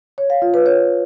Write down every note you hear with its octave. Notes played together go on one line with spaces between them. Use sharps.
C#5
F5
F4
B4
C#5